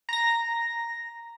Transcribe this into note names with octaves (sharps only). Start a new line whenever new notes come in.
A#5 A#6